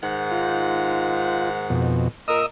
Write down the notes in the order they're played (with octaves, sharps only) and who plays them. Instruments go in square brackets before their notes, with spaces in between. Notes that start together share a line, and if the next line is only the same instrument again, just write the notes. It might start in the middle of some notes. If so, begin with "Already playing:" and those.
[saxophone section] G#2 D#3 F#5
[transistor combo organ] F4
F2 B2
[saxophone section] A#2 A#4 [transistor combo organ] D#5 D#6 E6